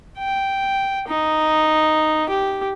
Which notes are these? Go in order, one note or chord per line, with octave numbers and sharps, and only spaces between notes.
G5
D#4
G4